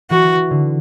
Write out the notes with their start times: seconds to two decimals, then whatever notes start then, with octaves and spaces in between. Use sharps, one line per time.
0.10 E3 F#4
0.51 D3